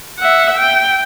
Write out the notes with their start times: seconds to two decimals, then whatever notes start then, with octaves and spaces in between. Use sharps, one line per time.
0.19 E5 F#5
0.57 G5